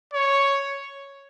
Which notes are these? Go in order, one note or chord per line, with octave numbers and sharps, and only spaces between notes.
C#5